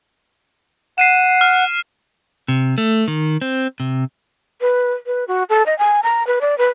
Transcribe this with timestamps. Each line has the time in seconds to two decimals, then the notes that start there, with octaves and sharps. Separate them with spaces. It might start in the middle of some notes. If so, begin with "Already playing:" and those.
0.98 F#5 C7 D#7 E7
1.41 F6
2.48 C3
2.78 A3
3.08 D#3
3.41 C4
3.80 C3
4.61 B4
5.06 B4
5.28 F#4
5.49 A4
5.66 D#5
5.79 G#5
6.03 A#5
6.27 B4
6.41 D5
6.58 B4